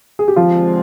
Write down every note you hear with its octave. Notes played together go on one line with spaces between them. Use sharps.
G#4
G4
D3 F3 G#3 C4 F4